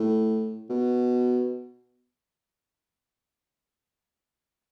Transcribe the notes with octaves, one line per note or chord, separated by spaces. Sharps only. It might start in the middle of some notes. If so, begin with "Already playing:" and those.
Already playing: A2
B2